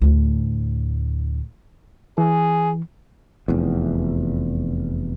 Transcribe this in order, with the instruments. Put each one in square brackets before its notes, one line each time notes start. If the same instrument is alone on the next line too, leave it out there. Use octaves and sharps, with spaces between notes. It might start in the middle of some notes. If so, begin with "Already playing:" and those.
[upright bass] D2 A2
[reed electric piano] E3 [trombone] G#4
[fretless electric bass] F1 E2